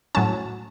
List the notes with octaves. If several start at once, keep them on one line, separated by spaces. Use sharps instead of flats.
A2 F#3 C#4 A5